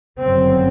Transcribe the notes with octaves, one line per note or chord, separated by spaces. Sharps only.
G1 F#2 C#3 C4